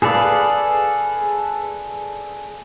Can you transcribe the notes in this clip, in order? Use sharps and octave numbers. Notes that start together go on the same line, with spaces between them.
G#4 A4 B4 D5 F5